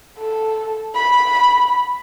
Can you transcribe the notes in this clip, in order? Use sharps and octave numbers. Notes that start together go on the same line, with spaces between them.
A4
B5